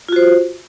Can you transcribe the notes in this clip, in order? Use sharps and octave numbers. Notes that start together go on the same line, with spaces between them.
F4 F#4 C5